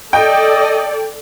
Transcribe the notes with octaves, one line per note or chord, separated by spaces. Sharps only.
A4 D5 D#5 G5